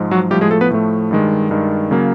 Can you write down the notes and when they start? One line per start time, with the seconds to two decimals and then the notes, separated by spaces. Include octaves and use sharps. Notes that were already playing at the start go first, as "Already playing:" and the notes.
Already playing: G#2 F3 G#3
0.11 F#3 F#4
0.31 A2 F3 G3 A3 G4
0.41 G#3 G#4
0.51 A3 A4
0.61 B3 B4
0.70 A2 F3 A3
1.11 G2 D#3 G#3
1.50 G2 D#3 G#3
1.91 C#3 F#3 A#3